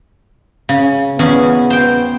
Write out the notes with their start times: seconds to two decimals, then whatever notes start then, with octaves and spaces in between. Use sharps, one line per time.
0.69 C#3
1.19 E2 B3 C#4 G#4
1.70 C5 G5